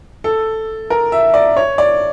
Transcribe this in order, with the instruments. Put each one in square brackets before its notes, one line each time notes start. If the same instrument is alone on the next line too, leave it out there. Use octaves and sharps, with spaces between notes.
[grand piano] A4
A#4
E5
D5
C#5
D5